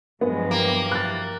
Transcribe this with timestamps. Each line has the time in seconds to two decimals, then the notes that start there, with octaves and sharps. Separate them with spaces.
0.21 G2 F3 F#3 G#3 B3
0.51 E3 A#3 E4 G4
0.92 F#6 A6